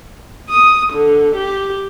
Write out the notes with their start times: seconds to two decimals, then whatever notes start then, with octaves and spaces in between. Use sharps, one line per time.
0.49 D#6
0.92 D3
1.35 G4